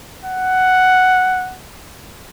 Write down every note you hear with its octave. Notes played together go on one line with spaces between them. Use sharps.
F#5